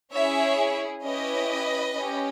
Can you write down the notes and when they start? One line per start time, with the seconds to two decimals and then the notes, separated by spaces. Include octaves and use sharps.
0.15 C#4 E4 G#4 C#5 E5
1.04 C#4 E4 G4 B4 D#5
1.95 C#4 G4